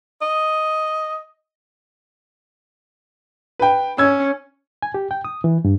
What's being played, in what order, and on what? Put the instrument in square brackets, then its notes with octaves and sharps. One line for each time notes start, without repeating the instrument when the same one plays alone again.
[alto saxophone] D#5
[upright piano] B4 G5
[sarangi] C#4 [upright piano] E6 G#6
[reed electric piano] G#5
G4
G5
D#6
E3
G2